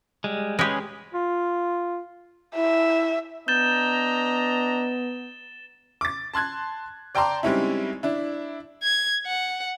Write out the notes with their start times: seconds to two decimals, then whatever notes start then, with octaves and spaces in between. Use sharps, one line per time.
0.24 G3 G#3
0.59 G#3 C#4 G4 G#4 B4
1.14 F4
2.55 E4 E5
3.48 B3 D4 D#5 A#5 G6 A6 E7 G7
6.01 D6 A6
6.34 A5 C6 F#6 G#6
7.15 D5 G5 A5 A#5 C6 D6
7.43 G3 G#3 C4 C#4 D#4 E4
8.03 D4 E4
8.83 G#6
9.27 F#5